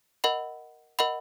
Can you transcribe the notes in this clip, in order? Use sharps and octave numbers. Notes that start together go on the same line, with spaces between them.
A#4 D#5 F#5 B5
A#4 D#5 F#5 B5